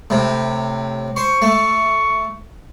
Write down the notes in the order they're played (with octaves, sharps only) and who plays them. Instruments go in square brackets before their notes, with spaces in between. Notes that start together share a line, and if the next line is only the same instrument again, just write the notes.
[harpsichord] A2 C3
[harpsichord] C5 [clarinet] C#6
[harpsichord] A3